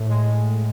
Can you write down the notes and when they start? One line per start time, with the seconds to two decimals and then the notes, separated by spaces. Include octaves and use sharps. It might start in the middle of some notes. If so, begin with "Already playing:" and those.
Already playing: A2
0.09 G#3